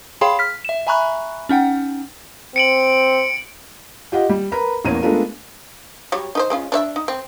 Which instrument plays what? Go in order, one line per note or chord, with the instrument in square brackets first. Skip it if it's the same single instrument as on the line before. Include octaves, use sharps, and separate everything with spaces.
[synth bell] G#4 C#5 F5 G5 B5 C6
F6 B6
E5 E7
E5 G#5 A#5 B5 C#6 F#6
C#4 D#4 F#5 G5
[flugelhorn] C4 [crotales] C#7 D7 F#7
[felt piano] F4 G4 D#5 F#5
G3
A#4 B4 A#5 B5
A1 E2 A#3 A#4 C#5 D#7
G#3 A3 B3 D4 F4 A#4
[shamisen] F#3 G3 C#5
D#4 B4 C5
G#3 C#4 F4
D4 C#5 E5
D#4
C4